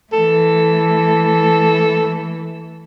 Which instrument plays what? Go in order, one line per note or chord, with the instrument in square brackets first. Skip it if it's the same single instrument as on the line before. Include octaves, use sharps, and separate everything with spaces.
[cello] E3 A3 [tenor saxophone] A4